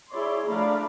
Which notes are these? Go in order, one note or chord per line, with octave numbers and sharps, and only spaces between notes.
E4 G#4 C#5 D5 C6
F3 A3 D4 F5 A#5 B5